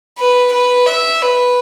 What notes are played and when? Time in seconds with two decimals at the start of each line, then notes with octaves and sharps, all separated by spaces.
0.18 B4
0.53 B4
0.87 E5
1.22 B4